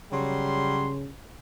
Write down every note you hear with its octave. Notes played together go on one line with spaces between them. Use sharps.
C#3 F#3 G3 C6